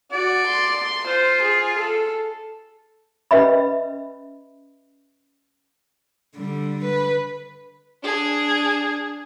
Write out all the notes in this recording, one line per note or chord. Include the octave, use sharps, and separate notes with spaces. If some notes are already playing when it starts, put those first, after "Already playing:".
F#4 D5
C6
F4 C5
G#4
A4
C#4 B4 D#5 E5 B5
D3 G3
B4
D4 G#4